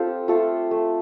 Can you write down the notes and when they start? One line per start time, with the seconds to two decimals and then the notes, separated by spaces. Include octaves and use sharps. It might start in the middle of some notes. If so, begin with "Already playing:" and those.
Already playing: C4 F4 G4 A4
0.28 A3 F4 A4
0.71 A3